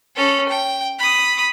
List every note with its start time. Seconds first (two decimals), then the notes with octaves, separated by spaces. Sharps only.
0.16 C#4 A4
0.49 G5
0.99 B5 D#6